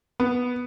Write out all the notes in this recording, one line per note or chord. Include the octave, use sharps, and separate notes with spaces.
B3